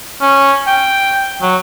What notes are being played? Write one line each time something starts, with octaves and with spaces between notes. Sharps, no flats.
C#4
G5
F#3